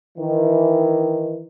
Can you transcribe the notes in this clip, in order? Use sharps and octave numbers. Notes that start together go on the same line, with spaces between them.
D#3 E3